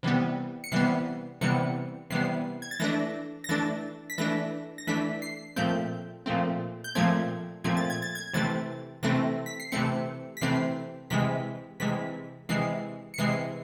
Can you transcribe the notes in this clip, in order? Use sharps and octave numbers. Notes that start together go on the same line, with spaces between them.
C3 E3 G3 B3
C#7
C3 E3 G3 B3 C7
C3 E3 G3 B3 C#7
C3 E3 G3 B3 C7
G#6
A6
E3 A3 D4 A#6
A#6
E3 A3 D4 A6
B6
E3 A3 D4 A#6
A#6
E3 A3 D4 B6
C7
A#2 F3 A3 C4 G6
A#2 F3 A3 C4
G6
A#2 F3 A3 C4 G#6
A#2 F3 A3 C4 G#6
A6
G#6
A6
G#6
C3 E3 A3 C4 A6
C3 E3 A3 C4 A#6
B6
C7
C3 E3 A3 C4 C#7
B6
C3 E3 A3 C4 C7
C3 E3 G#3 B6
C3 E3 G#3 B6
C3 E3 G#3 C7
C#7
C3 E3 G#3 C7